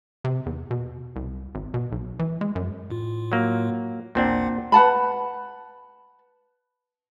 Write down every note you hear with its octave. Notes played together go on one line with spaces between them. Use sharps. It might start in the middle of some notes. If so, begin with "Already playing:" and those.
C3
E2
B2
C2
G#1
B2
B1
E3
G#3
F#2
A2 F4
F#3 A#3
A1 D#2 A#2 C4 D4 F#5
B4 F#5 A5 B5